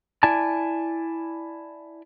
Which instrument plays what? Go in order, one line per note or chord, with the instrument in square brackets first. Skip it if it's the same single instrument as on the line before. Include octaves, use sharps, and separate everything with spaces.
[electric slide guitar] E4 D5 G#5 A5